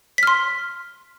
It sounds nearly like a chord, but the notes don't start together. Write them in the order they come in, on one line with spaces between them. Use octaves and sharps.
B6 F6 C6